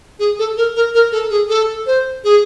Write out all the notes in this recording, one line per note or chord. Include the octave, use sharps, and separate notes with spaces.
G#4
A4
A#4
A#4
A#4
A4
G#4
A4
C5
G#4